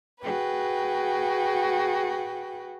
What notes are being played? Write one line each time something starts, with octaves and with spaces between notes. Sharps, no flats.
F#4 G#4 B4 G5